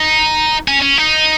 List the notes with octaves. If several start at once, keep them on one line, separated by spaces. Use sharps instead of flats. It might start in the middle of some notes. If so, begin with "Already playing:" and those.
Already playing: D#4
C#4
C#4
D#4